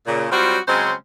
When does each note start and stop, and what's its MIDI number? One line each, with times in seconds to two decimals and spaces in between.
0.07 0.26 46
0.07 0.26 49
0.32 0.58 54
0.32 0.58 55
0.32 0.58 60
0.32 0.58 65
0.32 0.58 66
0.68 0.93 49
0.68 0.93 54
0.68 0.93 56
0.68 0.93 60
0.68 0.93 61
0.68 0.93 72